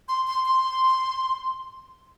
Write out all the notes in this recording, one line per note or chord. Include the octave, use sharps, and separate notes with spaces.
C6
C6
C6